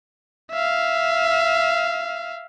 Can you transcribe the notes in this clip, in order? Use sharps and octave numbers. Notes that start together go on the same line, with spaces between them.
E5 F5